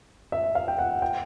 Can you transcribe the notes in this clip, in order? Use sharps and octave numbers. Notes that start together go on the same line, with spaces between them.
E5
F5
G5
F#5
G5